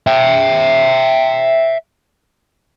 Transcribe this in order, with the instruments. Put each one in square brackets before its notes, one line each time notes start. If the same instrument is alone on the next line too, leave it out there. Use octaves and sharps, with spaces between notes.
[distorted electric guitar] E5 G5